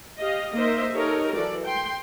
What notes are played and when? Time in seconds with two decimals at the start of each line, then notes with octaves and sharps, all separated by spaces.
0.19 G4 D#5 F5
0.56 A#3 D#4 A#4 C5 D#5 E5
0.92 D#4 G4 A4 A#4 C#5
1.35 E3 F#3 A4 D5
1.65 G5 C6